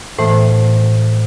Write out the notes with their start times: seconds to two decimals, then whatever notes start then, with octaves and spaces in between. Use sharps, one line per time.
0.18 A2 E3 A3 C5